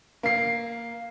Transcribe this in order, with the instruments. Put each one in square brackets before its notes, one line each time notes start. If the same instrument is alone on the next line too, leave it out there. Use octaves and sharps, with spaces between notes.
[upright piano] A#3 C7